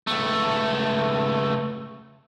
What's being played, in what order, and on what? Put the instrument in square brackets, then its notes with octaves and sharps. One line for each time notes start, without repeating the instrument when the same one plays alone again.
[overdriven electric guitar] C#2 A3